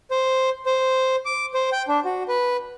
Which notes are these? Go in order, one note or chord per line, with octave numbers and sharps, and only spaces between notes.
C5
C5
D6
C5
G5
D4
F#4
B4